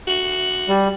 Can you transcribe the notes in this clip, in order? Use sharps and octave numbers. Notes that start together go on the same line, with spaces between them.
F#4
G3